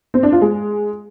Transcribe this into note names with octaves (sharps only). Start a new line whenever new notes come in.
C4
D4
F4
G#3